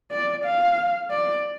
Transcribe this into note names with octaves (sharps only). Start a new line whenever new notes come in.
D5
F5
D5